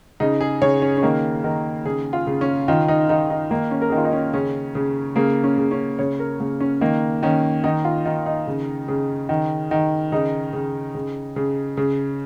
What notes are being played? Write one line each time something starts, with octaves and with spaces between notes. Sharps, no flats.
C#3 D#4
G#4
C#3 C#5
C#4
C#4
D#3 A#3
D#3 A#4
C#3 G#4
F4
C#3
C#4
D#3 F4
D#4
D#3 D#4
D#4
D#3 A#3
C#4
A#4
G#4
D#3
F4
D#4
C#4
C#3 C#4
C#3
C#3 A#3
C#4
C#3
C#4
C#3 C#5
A#4
C#3 A#3
C#4
D#3 A#3
D#3 C#4
D#3 D#4
F4
D#3
D#4
C#3
C#3
D#3
D#3
C#3 D#4
C#3
C#3
C#3
C#3